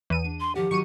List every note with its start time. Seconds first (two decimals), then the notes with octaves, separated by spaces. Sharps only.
0.10 E2 D#7
0.24 D4
0.40 C6
0.55 D#3 F3 G4 F#5
0.71 D#3 F#3 C#6 C#7 D#7